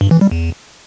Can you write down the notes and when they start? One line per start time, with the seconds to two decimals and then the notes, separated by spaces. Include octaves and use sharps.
0.01 G2
0.11 E3
0.21 G3
0.31 E2